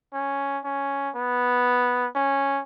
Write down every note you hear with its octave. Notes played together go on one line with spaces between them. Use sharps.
C#4
C#4
B3
C#4